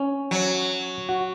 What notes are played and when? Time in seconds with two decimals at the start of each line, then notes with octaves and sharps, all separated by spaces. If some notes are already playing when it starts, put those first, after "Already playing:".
Already playing: C#4
0.31 F#3
1.09 F#4